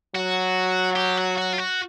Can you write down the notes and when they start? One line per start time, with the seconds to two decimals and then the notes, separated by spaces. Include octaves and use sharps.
0.15 F#3 F#4
0.96 G4
1.18 F#4
1.38 F#4
1.53 F4
1.58 F#4